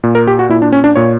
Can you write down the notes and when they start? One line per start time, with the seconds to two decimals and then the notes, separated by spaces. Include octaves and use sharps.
0.04 A#2
0.15 A#4
0.27 G4
0.39 F#4
0.49 A#2 E4
0.62 D4
0.72 C#4
0.84 D4
0.95 A#2 C#5